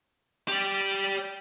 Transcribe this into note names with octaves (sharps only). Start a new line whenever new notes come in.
G4 D5